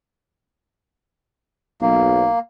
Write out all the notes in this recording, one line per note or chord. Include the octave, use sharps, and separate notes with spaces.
B1 A#3